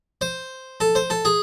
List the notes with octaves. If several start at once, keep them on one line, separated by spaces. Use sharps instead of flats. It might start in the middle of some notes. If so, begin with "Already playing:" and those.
C5
A4
C5
A4
G#4